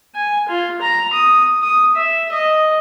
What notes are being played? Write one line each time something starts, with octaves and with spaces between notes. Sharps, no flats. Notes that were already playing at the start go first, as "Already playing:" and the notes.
G#5
F4
A#5
D#6
D#6
E5
D#5